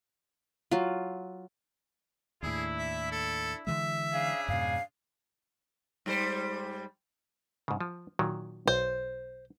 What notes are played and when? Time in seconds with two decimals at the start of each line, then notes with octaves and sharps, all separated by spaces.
0.71 F#3 F4
2.43 D#2 A2 D4 E4 G#4
2.79 E5
3.12 A4
3.67 D3 E3 G#3 E5
4.13 C#3 D4 G#4 F5
4.48 F2 G#2 B2 F5
6.06 G#2 G3 C5
7.68 G#2 C#3
7.81 F3
8.19 A#2 D#3 F#3
8.67 B1 C5